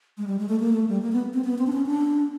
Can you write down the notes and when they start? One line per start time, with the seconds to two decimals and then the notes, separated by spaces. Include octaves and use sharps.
0.18 G#3
0.27 G3
0.39 G#3
0.49 A3
0.60 A#3
0.73 A3
0.88 G3
1.02 A#3
1.12 B3
1.34 C4
1.44 B3
1.58 C4
1.67 D4
1.72 C#4
1.86 D4